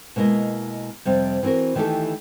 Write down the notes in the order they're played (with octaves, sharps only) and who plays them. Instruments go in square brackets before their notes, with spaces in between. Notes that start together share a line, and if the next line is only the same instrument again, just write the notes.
[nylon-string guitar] B2 G#3 A#3 E4 D#5
F2 C3 G3
E3 C4 F4 F#4 A#4
D#3 E3 A3 E4 G4 A4